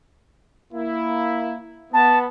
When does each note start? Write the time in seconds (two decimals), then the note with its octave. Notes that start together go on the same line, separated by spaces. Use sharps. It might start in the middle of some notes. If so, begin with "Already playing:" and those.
0.73 A#3 E4
1.93 B3 A5